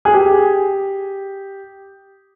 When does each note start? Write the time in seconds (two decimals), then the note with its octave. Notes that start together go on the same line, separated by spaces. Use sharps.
0.05 G#4
0.14 G4